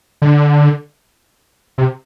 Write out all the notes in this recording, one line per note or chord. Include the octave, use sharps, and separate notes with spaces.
D3
C3